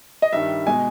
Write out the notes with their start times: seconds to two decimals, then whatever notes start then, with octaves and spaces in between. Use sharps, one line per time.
0.22 D#5
0.33 G2 D#3 G3 E5
0.67 B2 G#3 G#5